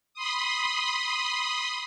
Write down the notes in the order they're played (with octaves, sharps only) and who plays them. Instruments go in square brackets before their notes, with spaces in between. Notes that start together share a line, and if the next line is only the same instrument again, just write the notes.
[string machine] B5 C6 D#6